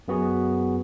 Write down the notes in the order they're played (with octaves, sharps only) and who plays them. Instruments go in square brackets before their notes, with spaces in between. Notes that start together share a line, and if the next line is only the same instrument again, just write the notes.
[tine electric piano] F#2 B3 F#4 G#4